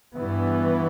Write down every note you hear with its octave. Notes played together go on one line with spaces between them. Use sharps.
G2 E3 B3